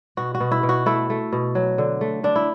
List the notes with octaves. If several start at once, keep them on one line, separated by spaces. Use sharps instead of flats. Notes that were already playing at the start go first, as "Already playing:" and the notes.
B2 F#4
F#4
B2
E4
B2
F#4
A3 E4
A3
B2
F#3
D3
A3
D3 D4
E4